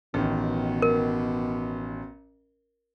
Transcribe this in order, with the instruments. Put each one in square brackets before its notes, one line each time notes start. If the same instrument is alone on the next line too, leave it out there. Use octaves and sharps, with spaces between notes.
[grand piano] A1 D#3 [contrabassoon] B2
[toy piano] A#4